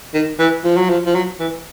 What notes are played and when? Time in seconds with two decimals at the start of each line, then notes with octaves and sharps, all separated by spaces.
0.14 D#3
0.39 E3
0.64 F3
0.77 F#3
0.90 F3
1.06 F3
1.15 F#3
1.40 E3